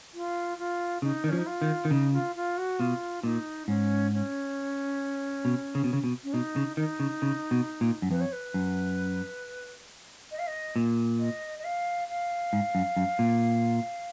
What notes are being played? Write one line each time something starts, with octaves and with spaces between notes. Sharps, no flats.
F4
F4
C#3 D#4
D#3
F3 C#4
D#4
F4
D#3
D#3
C#3 D#4
F4
F4
F#4
B2 F4
A#2 D#4
G#2 C#4
C#4
B2
C#3
B2
C#3
B2
C#4
B2 D#4
C#3
D#3 D#4
C#3
C#3
B2
A#2
F#2
F2 B4
C#5
B4
F#2
D#5
F5
D#5
A#2
D#5
D#5
F5
F5
G#2
F#2
F#2
A#2